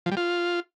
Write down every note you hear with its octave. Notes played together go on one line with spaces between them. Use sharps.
F3
G3
F4